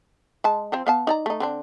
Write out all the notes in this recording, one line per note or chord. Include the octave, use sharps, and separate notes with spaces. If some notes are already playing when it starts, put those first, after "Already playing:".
G#3 A5
F3 C4 C5
B3 F5 A5
D#4 D5 A#5
A3 D#4
D3 C4 D4